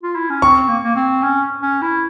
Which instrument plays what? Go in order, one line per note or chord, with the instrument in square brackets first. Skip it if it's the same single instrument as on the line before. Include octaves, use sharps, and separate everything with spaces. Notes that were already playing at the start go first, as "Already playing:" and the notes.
[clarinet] F4
E4
C#4
[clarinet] C4 [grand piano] C#6
[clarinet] A#3
A#3
C4
C#4
C#4
E4